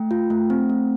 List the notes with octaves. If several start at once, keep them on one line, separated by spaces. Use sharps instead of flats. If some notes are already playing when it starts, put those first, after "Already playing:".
Already playing: A3 G5
F4
A3
C4
A3